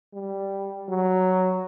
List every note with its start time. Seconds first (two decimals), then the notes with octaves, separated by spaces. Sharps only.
0.13 G3
0.88 F#3